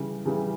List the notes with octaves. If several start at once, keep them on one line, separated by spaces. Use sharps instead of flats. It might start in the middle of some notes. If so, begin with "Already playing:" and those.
Already playing: C#3 E3 G3
C#3 E3 G3